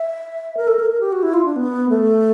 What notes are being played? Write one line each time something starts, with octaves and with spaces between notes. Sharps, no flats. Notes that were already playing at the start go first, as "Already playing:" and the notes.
Already playing: E5
A#4
A4
A#4
A#4
G4
F#4
E4
F4
D4
B3
A3